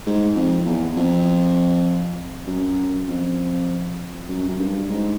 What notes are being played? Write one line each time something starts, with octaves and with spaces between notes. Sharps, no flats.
G#2
F2
E2
F2
F#2
F2
F#2
F#2
G2
G#2